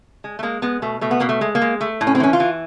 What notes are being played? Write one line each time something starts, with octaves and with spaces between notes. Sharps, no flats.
G#3
A3
G#3 A#3
G#3 B3
B2 A3
B2 A3
B3
B2 A#3
A3
G#3
A#3
G#3
A3
A2
C#4
C4
E3 C#4
F4
E3